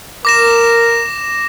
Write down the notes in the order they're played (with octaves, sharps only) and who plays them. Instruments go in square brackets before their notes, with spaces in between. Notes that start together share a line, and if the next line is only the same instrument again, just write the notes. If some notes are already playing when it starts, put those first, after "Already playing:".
[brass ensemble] A#4 [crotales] D6 A#6 E7